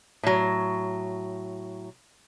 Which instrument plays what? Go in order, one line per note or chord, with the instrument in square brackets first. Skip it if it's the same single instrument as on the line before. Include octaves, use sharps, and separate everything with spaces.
[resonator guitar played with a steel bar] A2 F#3